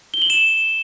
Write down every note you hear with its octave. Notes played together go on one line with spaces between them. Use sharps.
G7
F#7
E7